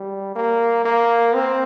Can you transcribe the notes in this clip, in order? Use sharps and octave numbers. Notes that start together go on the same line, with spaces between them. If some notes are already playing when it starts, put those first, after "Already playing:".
Already playing: G3
A#3
A#3
C4